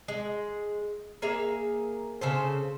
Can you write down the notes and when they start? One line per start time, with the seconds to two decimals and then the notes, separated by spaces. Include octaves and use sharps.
0.08 G#3
1.22 A#3 G#4 E5 A#5
2.21 C#3 A4 C5